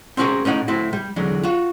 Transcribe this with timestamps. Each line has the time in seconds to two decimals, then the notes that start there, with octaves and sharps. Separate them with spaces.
0.17 C4 C#4 F#4 G#4 A#4
0.45 A2 C#4 D#4 F#5
0.68 A2 C4 E4 F#4
0.93 G3
1.16 E2 D3 F#3
1.43 F4 F#4